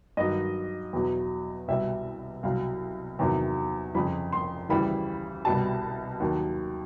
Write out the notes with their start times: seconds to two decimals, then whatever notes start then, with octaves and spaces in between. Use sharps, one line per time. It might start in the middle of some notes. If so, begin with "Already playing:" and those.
0.17 G2 D#3 F#3 D#5
0.93 E2 B2 F#3
1.68 C2 B2 G3 E5
2.43 C2 B2 F#3 F5
3.19 E2 C3 D#3 F#3
3.95 F2 C#3 F3 B5
4.32 C6
4.69 D2 C#3 E3 G3 B5
5.45 C2 B2 G3 A5
6.20 D#2 D#3 F#3